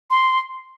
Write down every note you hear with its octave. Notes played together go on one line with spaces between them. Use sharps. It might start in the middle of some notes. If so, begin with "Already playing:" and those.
C6